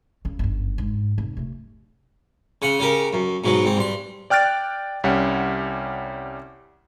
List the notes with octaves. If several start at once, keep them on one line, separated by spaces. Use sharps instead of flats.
C#2 C#3
G1 F#2
G#2
F1
C3 A3
C#3 F#5 C6
C#3 G4 A#4
F#2
G#2 B2 F#3
G#2 C4
G2 C6
D5 G5 F6 F#6 A6 D7
C2 G3 C#4 F#5